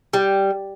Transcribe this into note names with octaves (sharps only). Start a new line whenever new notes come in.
G3